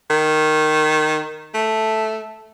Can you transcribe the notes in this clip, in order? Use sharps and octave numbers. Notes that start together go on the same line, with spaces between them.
D#3
A3